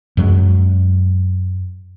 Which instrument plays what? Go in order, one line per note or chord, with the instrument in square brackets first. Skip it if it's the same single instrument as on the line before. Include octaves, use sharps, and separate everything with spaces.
[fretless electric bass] F#2 F#3 G#3